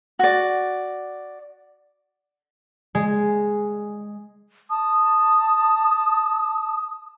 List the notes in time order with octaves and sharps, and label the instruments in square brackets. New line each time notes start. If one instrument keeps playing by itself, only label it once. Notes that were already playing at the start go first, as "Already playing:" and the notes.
[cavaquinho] F#4 D5
[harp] G#3
[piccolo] A5 [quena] D#6